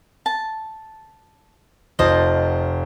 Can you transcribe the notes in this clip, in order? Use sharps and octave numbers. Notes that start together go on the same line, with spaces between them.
A5
F1 F4 C5 D#5 A5